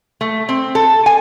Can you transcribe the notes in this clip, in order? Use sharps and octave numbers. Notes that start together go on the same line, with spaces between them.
A3
C4
A4
G#5